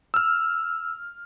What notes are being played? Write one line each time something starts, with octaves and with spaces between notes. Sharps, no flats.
E6 F6